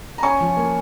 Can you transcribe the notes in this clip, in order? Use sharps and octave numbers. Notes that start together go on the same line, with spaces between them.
A#5
C#4 G#5 C#6
F3
A#3